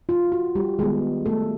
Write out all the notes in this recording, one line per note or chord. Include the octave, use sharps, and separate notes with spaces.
F4
F#4
G3 G4
D#3 G3 G#3 B3 G#4
A3 A4